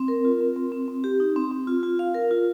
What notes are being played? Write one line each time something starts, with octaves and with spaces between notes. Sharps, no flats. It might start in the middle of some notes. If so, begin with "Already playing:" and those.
Already playing: C4
A#4
F4
C4
C4
C4
C4
G4
D#4
C4
C4
F4
F4
F5
A#4
F4